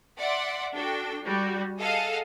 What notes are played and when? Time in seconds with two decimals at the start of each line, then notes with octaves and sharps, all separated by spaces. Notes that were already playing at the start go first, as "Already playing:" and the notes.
0.18 D5 E5 F#5 C6
0.74 D4 F#4 A4 G5
1.23 G3 F#4
1.78 G#4 A4 D#5 F5 F#5